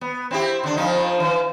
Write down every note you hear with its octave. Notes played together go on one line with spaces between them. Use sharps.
B3
C4 E4 G4
D3 D4
F2 F3 D#4
E3